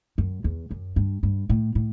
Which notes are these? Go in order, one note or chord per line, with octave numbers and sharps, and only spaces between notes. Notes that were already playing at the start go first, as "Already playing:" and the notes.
F#2
E2
F#2
G2
G2
A2
A2